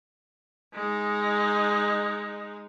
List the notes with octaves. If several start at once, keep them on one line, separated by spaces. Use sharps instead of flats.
G#3 D#4